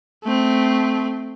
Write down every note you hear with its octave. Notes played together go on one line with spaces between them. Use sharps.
A3 C4